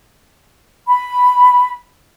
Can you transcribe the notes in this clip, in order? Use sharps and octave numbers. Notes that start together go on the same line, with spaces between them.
B5